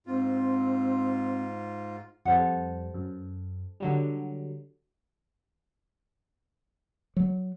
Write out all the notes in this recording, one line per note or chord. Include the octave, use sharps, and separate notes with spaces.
G#2 C4 F4
F2 G3 A4 C5 F#5
F#2
D3 F#3 G3
F#3